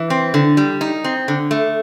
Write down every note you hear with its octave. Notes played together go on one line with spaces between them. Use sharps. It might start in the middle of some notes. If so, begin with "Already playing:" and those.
Already playing: E3
C4
D3
G3
D#4
C4
D3
A3